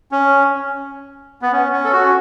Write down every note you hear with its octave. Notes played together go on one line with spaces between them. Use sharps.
C#4
B3
C#4
C#4
A4
F#4
C#4